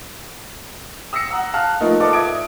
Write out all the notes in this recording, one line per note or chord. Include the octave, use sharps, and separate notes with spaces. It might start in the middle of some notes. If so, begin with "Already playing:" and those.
D#6 E6 A#6 C7 C#7
F#5 A#5 E6
F5 A5 F6 F#6
F3 A3 A#3 D#4 F4
F4 A4 B4 D5 D#5 D6
E5 D#6 G#6 D7